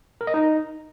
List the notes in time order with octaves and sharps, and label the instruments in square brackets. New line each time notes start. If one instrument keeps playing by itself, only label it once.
[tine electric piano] A#4
D#5
D#4